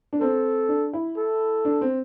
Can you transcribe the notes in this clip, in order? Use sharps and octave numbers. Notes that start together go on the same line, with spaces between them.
D4
C4 A4
D4
E4
A4
D4
C4